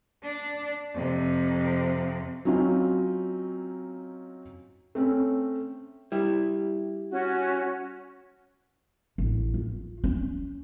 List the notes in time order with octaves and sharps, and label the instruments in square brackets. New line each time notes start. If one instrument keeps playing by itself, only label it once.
[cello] D4
F2 C3
[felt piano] F#3 C4 C#4 D#4 F4
A3 C4 C#4
[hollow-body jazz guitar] G3 E4
[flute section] C#4 F#4
[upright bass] A1
F4
C#4